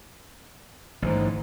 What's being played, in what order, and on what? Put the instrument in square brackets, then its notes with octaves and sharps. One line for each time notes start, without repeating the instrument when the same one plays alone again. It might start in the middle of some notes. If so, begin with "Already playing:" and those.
[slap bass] A1 D#3 E3 [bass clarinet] G#2